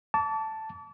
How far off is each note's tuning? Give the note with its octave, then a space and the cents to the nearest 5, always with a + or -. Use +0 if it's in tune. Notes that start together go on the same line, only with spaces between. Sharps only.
A5 +0 D6 -40